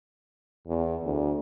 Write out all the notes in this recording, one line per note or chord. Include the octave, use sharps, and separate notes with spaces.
E2
D2